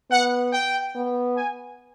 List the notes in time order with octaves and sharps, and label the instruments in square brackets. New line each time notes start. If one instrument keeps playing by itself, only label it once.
[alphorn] B3 [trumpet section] F#5
[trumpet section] G5
[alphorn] B3
[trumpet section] G#5